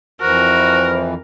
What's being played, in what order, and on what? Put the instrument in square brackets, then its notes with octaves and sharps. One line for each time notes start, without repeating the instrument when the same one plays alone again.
[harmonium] F2 E3 [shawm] F#4 [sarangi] A#4 [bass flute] C5